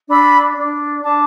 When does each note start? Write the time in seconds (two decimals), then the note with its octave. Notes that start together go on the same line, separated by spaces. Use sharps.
0.09 D4 B5 E6
0.56 D4
1.03 D4 A5 D6